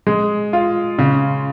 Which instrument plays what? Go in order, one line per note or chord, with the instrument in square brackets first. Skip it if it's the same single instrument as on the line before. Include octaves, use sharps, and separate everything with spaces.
[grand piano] G#3
F4
C#3